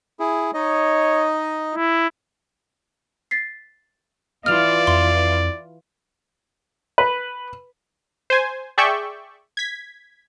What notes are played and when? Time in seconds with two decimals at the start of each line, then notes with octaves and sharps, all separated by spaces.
0.20 E4 G#4
0.54 D#4 C#5 D#5
1.75 E4
3.31 A6 B6 C7
4.46 E3 F4 D5 F6 F7
4.87 F2 C6
6.98 B4
8.30 C5 G#5
8.78 G#4 D5 E5 G5 C#6 G6
9.57 G#6 B6